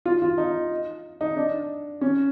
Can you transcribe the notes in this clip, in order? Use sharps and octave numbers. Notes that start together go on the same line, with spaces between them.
F4
F4
D#4
D#4
D4
C#4